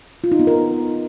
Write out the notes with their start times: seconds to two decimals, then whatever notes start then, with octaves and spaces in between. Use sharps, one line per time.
0.24 F4
0.32 D#4
0.39 B3
0.47 A#4